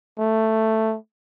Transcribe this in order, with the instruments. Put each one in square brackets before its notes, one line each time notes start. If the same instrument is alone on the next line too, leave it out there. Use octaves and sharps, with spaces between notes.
[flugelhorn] A3